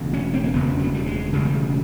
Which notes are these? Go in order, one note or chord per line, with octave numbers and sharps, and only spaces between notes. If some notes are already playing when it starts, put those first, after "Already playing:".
Already playing: E1 D2 C#3
C#4
C4
A#3
E1 D2 C#3 B3
F#3
G3
G#3
E1 D2 C#3 G3